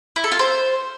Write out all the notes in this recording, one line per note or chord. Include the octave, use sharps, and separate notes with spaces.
E4
A4
F4
C5